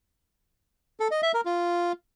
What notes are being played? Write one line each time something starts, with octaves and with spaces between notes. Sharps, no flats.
A4
D#5
E5
A#4
F4